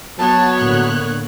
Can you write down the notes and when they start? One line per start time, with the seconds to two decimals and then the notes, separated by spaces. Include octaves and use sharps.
0.19 F#3 B3 C#5 A5
0.59 A2 D3 A#3 F#6